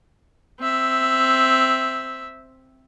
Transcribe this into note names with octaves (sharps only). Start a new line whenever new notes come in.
C4 E5